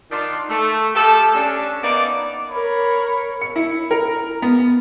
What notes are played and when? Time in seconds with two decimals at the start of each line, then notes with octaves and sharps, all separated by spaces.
0.11 D#3 D4 F4
0.49 A3
0.95 F3 A3 G4 A4
1.35 C#4 D4
1.82 A#3 B3 D#4 D5
2.50 A#4 C#5 B5
3.41 C#7
3.56 E4
3.91 A#4
4.42 B3